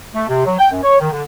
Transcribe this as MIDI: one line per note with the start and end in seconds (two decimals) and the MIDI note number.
0.14 0.27 57
0.28 0.45 48
0.45 0.55 54
0.59 0.67 79
0.71 0.81 42
0.83 0.96 73
0.99 1.11 51
1.11 1.22 50